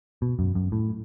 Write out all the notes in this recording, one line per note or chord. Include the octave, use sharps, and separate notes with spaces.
B2
F#2
F#2
A2